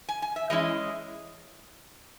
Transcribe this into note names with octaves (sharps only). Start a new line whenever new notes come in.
G#5
G#5
E5
E3 G#3 C#4 E4 D#5